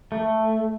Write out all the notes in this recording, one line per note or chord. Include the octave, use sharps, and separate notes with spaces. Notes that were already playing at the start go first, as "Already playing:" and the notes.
A3